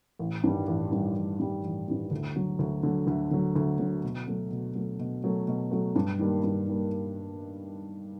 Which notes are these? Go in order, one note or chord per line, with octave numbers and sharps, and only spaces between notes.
A1
G2 D#3 G3
A1
G2 D#3 G3
A1
G2 D#3 G3
A1
G2 D#3 G3
D2
D3 F#3
D2
D3 F#3
D2
D3 F#3
D2
D3 F#3
B2
F#3 A3
B2
F#3 A3
B2
F#3 A3
B2
F#3 A3
G2
D#3 G3 A#3
G2
D#3 G3 A#3